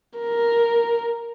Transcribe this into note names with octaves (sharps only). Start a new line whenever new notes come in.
A#4